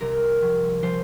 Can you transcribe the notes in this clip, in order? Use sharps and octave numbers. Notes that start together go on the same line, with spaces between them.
C2 A#4
F3
F3 C5